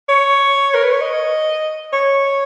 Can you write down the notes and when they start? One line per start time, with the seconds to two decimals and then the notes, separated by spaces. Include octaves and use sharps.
0.09 C#5
0.75 A#4
0.83 B4
0.92 C#5
1.01 D#5
1.93 C#5